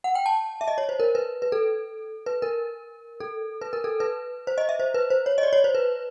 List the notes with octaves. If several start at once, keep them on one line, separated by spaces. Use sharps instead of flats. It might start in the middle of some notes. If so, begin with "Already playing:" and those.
F#5
G5
A5
E5
D#5
C#5
C5
A#4
B4
B4
A4
B4
A#4
A4
B4
A#4
A4
B4
C5
D#5
E5
C5
B4
C5
C#5
D#5
D5
C#5
C5
B4